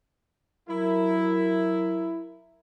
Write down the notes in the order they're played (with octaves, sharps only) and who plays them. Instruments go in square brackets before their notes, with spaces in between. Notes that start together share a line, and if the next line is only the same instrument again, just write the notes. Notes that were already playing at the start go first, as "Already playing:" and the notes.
[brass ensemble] F#3 A#4 [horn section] E4